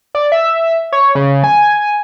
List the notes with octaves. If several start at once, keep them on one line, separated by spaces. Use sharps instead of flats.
D5
E5
C#5
C#3
G#5